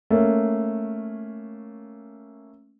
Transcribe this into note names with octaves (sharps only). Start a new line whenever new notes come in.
A3 A#3 C#4